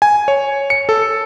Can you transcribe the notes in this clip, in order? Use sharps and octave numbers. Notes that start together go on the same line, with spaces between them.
G#5
C#5
C#7
A4